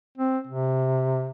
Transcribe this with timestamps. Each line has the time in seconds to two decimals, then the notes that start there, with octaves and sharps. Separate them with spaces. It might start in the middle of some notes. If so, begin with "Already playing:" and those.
0.18 C4
0.47 C3